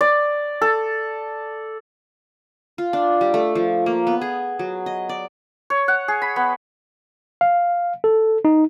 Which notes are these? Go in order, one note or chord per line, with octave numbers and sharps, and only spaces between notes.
D5
A4
F4
D4
G3
A3
F3
A#3
B3
G#4
F#3
D#5
D5
C#5
F#5
G#4
B5
B3
F5
A4
D#4